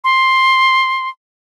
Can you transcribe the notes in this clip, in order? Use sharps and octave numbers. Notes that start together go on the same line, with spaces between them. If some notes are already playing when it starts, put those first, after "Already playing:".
C6